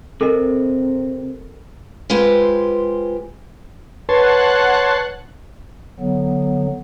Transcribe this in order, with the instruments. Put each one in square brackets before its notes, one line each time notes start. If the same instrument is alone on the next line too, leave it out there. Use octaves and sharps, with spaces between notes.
[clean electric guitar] C3 [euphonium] C4 [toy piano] A4 A#4 D#5
[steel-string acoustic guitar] G#3 F4 G4 B4 C5
[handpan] B4 [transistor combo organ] C#5 A5 C6 [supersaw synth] F#5 F#6
[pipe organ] D3 F#3 B3